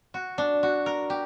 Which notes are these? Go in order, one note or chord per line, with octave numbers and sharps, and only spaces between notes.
F#4
D4
F#4
A#4
G4